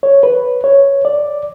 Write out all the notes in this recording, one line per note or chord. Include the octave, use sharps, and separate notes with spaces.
C#5
B4
C#5
D5